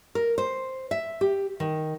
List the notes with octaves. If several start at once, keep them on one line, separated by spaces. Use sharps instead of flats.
A#4
C5
E5
G4
D#3